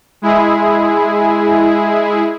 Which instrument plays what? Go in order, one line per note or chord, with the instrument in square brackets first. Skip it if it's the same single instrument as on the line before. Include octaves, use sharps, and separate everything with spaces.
[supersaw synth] G#3 E4 G#4